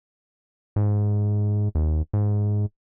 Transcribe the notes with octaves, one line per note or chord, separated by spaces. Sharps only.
G#2
D#2
G#2